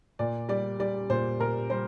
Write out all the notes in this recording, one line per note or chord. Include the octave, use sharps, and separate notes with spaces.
A#2 D5
G3 D5
G3 D5
A#2 C5
A#2 A#4
G3 C5